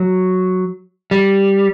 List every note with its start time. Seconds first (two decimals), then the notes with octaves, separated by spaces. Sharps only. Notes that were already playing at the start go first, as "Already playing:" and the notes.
Already playing: F#3
1.11 G3